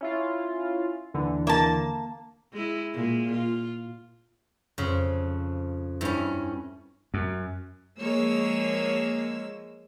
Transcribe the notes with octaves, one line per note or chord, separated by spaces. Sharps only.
C#4 E4 F4
D#2 D3 E3
A#3 A5
G#3 E4
A#2 G#3
F4
F2 C#3
G2 C#4 E4
F#2
F3 G#3 A#3 C#5 E6